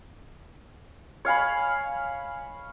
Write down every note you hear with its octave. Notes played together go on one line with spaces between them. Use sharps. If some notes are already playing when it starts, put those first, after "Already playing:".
C#5 F5 G#5 B5